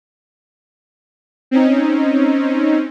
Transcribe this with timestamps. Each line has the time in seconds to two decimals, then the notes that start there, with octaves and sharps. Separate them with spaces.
1.51 C4 C#4 D#4